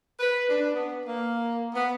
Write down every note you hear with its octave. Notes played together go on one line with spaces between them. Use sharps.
B4
D4
B3
A#3
B3